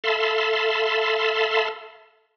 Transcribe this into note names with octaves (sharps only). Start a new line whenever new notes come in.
A4 E5 F5 A5 B5 C6